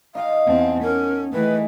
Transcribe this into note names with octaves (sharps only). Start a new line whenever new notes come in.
D#4 D#5 F5 G5
E2 C4 F#5 G#5 A5
C#4 A#4
D#3 E3 A3 G#4 B4